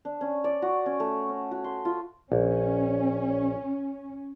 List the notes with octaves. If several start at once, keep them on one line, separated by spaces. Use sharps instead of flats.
D4
C#4
D5
F#4
C#4
A3
C#4
F#4
C6
F4
A#1 C#4